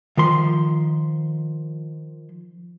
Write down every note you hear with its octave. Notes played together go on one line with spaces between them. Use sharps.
D#3 F3 C6